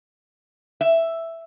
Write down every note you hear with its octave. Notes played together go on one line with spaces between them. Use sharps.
E5